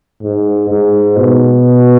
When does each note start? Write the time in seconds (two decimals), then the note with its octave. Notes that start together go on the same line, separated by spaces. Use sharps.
0.23 G#2
0.70 G#2
1.17 B2